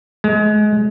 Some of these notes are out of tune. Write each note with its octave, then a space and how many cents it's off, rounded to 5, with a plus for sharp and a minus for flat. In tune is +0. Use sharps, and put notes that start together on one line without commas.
G#3 +25